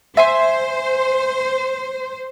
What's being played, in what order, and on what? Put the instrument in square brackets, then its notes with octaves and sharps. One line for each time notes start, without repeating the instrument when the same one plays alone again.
[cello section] C5 [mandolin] E5 G#5 C6